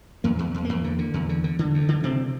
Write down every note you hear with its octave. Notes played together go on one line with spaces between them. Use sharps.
E2 A#3
E2
E2
E2 A#3
D3
D3
E2
D3
D3
D3
D2
D3
C3 C4